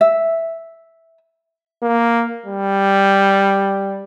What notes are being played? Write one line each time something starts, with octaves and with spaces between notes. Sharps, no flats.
E5
A#3
G3